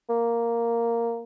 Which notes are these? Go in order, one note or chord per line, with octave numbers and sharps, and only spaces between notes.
A#3